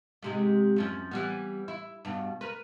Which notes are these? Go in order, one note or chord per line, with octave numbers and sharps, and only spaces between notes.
G#2 C3 G#3
F#2 F3 C#4
E3 G3 B3
E4
G2 B2
A#4 B4